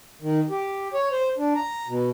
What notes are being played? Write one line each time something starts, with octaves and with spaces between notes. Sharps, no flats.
D#3
G4
C#5
C5
D4
A#5
B2